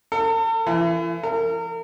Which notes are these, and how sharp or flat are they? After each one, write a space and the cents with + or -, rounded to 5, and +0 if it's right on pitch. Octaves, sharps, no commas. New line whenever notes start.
A4 +45
E3 +35
A#4 -35